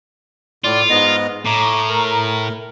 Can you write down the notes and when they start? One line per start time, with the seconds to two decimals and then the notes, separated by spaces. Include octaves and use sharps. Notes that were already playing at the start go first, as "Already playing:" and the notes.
0.64 A2 F4 D5
0.90 G#2 B3 D#5
1.46 A2 A#5 D6
1.89 A#4